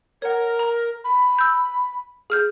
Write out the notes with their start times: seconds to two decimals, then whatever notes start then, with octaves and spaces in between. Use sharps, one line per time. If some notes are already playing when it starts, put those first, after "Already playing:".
0.22 A#4 C#5 F#5
0.59 A#5
1.04 B5
1.39 E6 G6
2.30 G#4 F6 G6